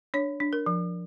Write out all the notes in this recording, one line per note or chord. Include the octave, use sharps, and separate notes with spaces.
D4 C#5
D4
A#4
F3